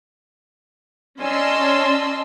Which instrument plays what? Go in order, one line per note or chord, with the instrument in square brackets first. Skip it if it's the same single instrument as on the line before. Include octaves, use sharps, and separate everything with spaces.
[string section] C#4 D5 D#5 A5 C6 E6